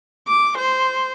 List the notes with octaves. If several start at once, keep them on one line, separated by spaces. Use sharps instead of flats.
D6
C5